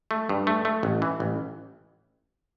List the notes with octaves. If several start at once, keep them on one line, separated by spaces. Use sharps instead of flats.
A3
G2
A3
A3
A1
E3
A1